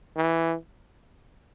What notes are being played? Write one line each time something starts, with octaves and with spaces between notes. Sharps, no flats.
E3